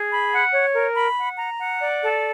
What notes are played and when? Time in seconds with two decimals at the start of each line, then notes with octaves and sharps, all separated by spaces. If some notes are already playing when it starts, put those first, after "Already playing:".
Already playing: G#4
0.12 B5
0.32 F#5
0.53 C#5
0.74 A#4
0.96 B5
1.17 F#5
1.38 A#5
1.59 F#5
1.80 D5
2.02 A4